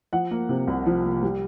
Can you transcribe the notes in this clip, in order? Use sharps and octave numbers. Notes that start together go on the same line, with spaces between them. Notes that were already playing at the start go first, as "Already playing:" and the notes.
F3 F#5
A#3
C3
C2
F3
A#3
G3